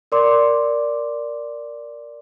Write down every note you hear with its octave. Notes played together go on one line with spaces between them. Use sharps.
A#4 D5 C6 D6